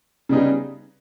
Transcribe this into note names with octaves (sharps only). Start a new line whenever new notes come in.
C#3 G3 B3 D#4 G#4